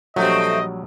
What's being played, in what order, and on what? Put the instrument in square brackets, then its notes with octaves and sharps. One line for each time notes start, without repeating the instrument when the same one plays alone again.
[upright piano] A#1 G3 [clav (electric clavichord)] F#3 [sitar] A3 C4 [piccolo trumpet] D#5